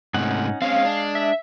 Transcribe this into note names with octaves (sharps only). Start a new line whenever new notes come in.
G#2 C3 A3 C#4 D#4 F#5
G#3 C4 C#4 F5
D4
E5